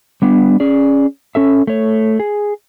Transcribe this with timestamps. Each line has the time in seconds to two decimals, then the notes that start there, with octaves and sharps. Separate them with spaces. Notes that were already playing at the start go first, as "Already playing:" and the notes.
0.22 G3 B3 D4
0.60 C#4 G#4 D5
1.35 C#4 A4 E5
1.67 A3 C#5
2.20 G#4